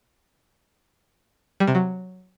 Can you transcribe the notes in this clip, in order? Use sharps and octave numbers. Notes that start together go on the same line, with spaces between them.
G3
C3
F#3